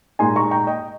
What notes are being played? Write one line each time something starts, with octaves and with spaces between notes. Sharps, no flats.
A#2 G#3 D#4 G#5 C6
A#5 C#6
G5 A#5
D#5 G5